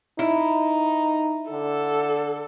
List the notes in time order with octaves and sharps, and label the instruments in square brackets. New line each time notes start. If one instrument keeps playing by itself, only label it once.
[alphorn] D#4 [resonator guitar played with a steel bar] E4
[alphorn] D3 [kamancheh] A4